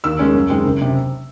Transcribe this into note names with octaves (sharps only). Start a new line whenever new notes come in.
D#2 E6
D#3 G#3 C#4
F#2
D#3 G#3 C4
F#1
C3